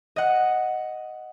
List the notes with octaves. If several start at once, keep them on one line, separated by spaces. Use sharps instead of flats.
D#5 F#5